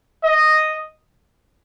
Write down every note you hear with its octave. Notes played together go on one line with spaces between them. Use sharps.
D#5